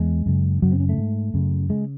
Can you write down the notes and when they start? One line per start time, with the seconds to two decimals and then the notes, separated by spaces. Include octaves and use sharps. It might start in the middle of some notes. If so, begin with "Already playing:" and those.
Already playing: E2 G#3
0.26 F#2 C#3
0.62 F#2 C#3 F#3
0.72 C4
0.80 C#4
0.89 A3
0.98 G#2
1.34 F#2 C#3
1.69 C#3 G#3